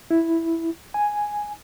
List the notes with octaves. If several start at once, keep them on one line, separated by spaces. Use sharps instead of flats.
E4
G#5